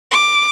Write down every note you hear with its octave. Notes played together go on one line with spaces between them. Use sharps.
D6